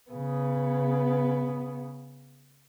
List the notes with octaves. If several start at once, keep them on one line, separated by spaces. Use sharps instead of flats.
C#3 B3